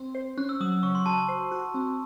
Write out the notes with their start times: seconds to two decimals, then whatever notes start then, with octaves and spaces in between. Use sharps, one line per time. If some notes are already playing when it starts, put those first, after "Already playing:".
Already playing: C4
0.15 C5
0.37 C#4 F#6
0.49 E6
0.60 F#3 D#6
0.72 E6
0.83 C#3 C#6
0.95 C6
1.06 F#4 A5
1.18 A5
1.28 C5
1.51 F#4
1.74 C4